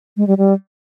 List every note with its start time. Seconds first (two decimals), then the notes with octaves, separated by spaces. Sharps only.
0.17 G#3
0.27 G3
0.38 G3